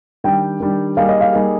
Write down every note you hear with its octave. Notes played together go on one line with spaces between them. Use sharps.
D#3 G3 D4 G5
D#3 G3 D4
G3 A#3 D#4 G#4 F5
D#5
F5
G3 A#3 D#4 G#4